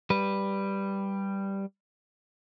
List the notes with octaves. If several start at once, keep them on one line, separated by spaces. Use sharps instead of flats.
G3 B4